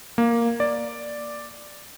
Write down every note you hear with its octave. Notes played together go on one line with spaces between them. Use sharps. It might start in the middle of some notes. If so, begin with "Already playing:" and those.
A#3
D5